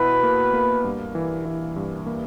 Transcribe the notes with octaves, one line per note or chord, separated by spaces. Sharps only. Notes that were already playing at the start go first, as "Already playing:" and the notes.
Already playing: B2 E4 B4
A#3
A#3
G2
E3
E3
G2
A#3